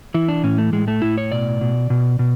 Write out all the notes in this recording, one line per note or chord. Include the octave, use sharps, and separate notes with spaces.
E3 E4
D4
A2 C#4
A3
A2 G#3
A3
A2 E4
C#5
B2 D5
B2
B2
B2